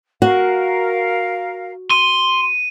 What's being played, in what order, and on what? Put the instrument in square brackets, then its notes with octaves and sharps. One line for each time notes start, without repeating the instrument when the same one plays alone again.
[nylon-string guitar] F#4 [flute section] A#4 F5
[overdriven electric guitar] C6 [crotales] D#7